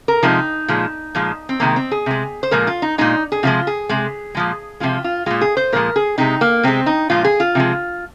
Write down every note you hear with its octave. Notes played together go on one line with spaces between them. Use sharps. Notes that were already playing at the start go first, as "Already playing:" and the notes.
A#4
C3 F3 G#3 D#4
A#2 F3 G#3
A#2 F3 G#3
C4
C3 D#3 G#3 A#3
C4
G#4
C3 G#3
C5
A#2 F3 G#3 A#4
F4
D#4
A#2 G#3 D#4
G#4
C3 F3 G#3 F4
G#4
C3 G#3
A#2 F3 G#3
C3 F3 G#3 F4
F4
A#2 G#3 F4
G#4
C5
A#2 F3 G#3 A#4
G#4
C3 G#3 D#4
A#3
C3 G#3 C4
D#4
A#2 F3 G#3 F4
G#4
F4
C3 F3 G#3